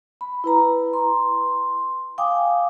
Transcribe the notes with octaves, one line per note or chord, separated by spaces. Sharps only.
B5
E4 B4 A#5
C6
F5 G5 G#5 D6 D#6